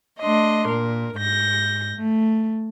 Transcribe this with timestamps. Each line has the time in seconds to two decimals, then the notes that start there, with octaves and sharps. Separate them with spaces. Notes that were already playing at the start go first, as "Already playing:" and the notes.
0.21 A3 D4 D#5 C6
0.67 A#2 A#4
1.16 G#2 G6 A#6
1.96 A3